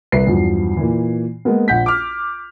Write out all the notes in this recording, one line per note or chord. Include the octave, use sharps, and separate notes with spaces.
C2 B4 C7
E2 G2 F3 F#3
A#2 E3
G#3 A#3 B3
A#1 F#5 G6 B6
D6 F6